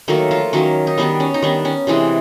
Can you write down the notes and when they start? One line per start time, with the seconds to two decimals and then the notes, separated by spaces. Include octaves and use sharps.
0.08 D#3 F#3 A3 A#3 A4
0.31 F3 F4
0.53 D#3 F#3 A#3 C#4
0.87 D#4
0.98 D#3 G3 B3 D4
1.20 C#4
1.34 D#4
1.42 D#3 G3 B3 D4
1.65 C#4
1.87 C3 E3 G#3 D4